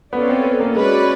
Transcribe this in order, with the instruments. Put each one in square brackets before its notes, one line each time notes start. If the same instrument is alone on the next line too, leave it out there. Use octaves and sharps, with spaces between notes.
[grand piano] B3 [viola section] C#4 F4 A4 D5
[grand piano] C4
B3
A#3
[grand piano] G#3 [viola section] C#4 F#4 B4 D5